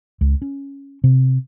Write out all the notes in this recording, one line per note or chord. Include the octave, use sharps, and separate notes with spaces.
C#2
C#4
C3